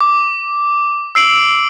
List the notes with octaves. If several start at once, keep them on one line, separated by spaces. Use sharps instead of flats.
D6
E6 C7 D7 F#7